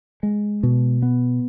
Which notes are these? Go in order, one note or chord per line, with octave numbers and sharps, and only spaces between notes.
G#3
B2
B3